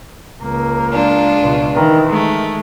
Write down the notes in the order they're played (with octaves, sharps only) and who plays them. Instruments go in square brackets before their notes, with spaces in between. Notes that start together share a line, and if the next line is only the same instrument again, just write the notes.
[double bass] C#2 A#3
[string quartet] G#3 D4 F4
[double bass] C#2 B2
D#3 E3
[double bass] D#3 [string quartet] G#3 A3